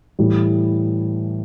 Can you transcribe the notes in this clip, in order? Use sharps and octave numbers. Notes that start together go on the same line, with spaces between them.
A2 E3 G3